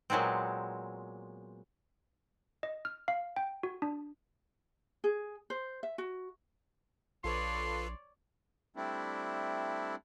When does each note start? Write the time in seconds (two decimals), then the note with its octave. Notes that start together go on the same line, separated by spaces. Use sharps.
0.10 A#2 F#3 G#3 B3 C4
2.63 D#5
2.85 F6
3.08 F5
3.36 G5
3.63 F#4
3.82 D4
5.04 G#4
5.50 C5
5.83 E5
5.98 F#4
7.24 A#1 F4 A4 B4 C#5 D5 C6
8.76 G3 A3 C4 D4 E4